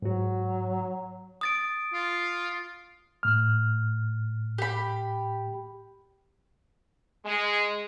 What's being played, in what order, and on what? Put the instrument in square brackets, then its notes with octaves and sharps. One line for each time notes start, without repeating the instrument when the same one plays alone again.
[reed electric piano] G#2 F#4 [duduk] F#3
[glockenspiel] D#6 A6 D7
[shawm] F4
[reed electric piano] A2 F6
[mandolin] G4 B5
[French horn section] G#3